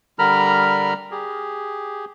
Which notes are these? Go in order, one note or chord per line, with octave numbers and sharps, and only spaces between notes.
D3 G3 A#4 A#5 B5 F6
G4 G#4